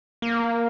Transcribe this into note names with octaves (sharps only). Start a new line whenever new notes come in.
A#3